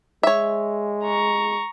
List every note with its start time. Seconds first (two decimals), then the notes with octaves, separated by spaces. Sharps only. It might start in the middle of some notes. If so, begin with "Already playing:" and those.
0.23 G#3 C#5 E5
1.05 A#5 C#6